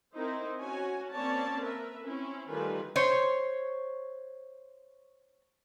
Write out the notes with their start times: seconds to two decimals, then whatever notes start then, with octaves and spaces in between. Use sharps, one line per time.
0.15 C4 D#4 E4 A#4 C5
0.60 C#4 F#4 C#5 G#5
1.12 A#3 C4 C#4 C#5 D5 A5
1.62 A#4 B4 E5
2.04 C4 C#4 E4
2.49 D#3 G3 A3 F4 B4 G#5
2.96 C5 C#5